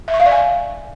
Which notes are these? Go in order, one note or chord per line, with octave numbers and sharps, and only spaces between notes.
E5
C#6
F5
D5
G#5